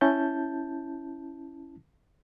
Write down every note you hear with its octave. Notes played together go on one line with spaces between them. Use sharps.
C#4 E4 A5 G6